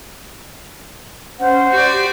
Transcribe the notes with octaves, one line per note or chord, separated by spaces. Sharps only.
C#4 C5 F#5
F#4 G4 D5